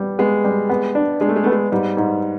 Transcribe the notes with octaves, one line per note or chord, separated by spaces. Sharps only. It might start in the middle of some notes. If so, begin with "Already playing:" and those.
Already playing: G3 B3
G#3 B3
G3
B3
D4
G#3 D4
A3
G#3
A3
B3
G#3
G#2 G3
G#2